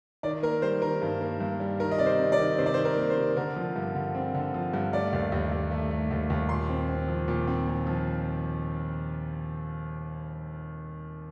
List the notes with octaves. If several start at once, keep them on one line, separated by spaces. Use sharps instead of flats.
D#3 D5
A#3 A#4
G3 C5
D#3 A#4
G2
A#3
G2
G3
D#3 A#4
D#5
C3 D5
C5
C3
D5
D#3
C3 C5
D5
C5
D#3
A#4
A#3
C5
C3
D3 A#4
F3
G2
D3
C4
D3
F3
G2
A3 D5
D#2
D#2
D#2
A3
A3
D#2
D#2
A#2 C6
C4
C4
F3
A#2
C4
A#2
F3